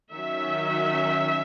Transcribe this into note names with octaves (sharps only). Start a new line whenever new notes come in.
D#3 F#3 C#4 E5